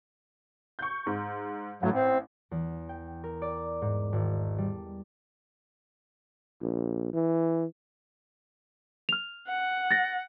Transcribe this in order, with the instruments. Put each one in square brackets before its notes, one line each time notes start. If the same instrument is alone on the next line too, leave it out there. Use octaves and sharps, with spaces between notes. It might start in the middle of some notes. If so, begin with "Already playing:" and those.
[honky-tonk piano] C#6 G6
G#2
[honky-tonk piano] A1 [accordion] A2 F#3
[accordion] C4
[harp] E2
G5
A#4
D5
G#2
G#1
G3
[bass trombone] A#1
E3
[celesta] F6 F7
[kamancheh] F#5
[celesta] A6 A#6